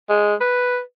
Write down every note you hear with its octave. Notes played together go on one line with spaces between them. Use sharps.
G#3
B4